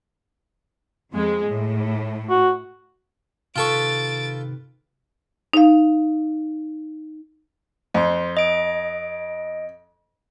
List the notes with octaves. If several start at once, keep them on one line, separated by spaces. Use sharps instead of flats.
F2 G#3
A2
F#4
C3 D#3 F4 A4 B4 C#6 A6 D7
D#4 F5
F2 C5 C6
D#5 D7